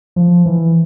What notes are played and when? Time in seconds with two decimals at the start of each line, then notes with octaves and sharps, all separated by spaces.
0.16 F3
0.46 E3